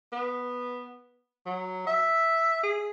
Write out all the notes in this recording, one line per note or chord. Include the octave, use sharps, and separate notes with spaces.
B3
F#3
E5
G#4